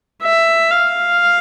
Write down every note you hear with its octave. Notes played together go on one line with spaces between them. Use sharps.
E5
F5